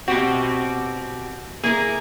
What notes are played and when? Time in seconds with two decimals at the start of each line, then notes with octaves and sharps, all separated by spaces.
0.08 B2 C4 F#4 G4
1.64 A#3 E4 G#4 A#4